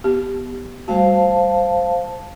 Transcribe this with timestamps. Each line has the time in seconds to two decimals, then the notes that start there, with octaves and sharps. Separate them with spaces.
0.04 B3 G4
0.88 G3 A3 F#4 C5 F5 A5